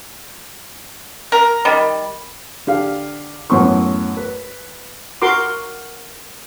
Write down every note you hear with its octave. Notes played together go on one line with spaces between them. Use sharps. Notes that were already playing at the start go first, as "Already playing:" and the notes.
A#4
D#3 G3
D3 G4 F5
F#2 A2 E3 B3 C6 C#6
B4
F#4 A#4 C6 D6